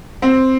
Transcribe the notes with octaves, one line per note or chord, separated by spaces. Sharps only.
C4